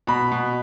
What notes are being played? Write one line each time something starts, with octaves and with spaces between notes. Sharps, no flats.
B2 B5
B2